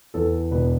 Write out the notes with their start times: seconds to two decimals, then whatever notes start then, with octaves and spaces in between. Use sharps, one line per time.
0.14 E2 A4
0.51 E1 B4